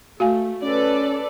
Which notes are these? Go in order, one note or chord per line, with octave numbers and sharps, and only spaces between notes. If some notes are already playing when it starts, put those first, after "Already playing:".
A3 F#4 F5 G#5
C#4 A4 B4 D5